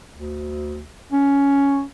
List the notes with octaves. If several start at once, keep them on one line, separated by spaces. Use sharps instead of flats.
D2
C#4